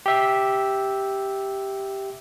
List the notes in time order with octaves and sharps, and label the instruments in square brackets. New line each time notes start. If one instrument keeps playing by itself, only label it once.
[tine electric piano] G4 E5